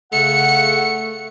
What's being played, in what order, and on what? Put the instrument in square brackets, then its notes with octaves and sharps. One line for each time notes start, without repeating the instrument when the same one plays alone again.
[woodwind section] C#3 F#5 [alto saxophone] A3 [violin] C#7